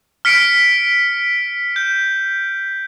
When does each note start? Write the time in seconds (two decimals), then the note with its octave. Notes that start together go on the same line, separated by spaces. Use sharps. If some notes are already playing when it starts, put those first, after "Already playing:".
0.25 F6 B6 C#7 D7
1.76 G6